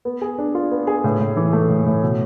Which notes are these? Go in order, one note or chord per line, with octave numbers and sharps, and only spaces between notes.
B3
G#4
D4
F4
B3
G#4
A2
A2
E3
A3
A2
A2
B2